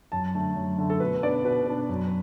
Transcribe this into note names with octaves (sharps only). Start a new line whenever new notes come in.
F#2 A5
D3 A3
F#2
D3 A3
A4
B2 B4
B3 D4 D5
B2 B4
B3 D4
F#2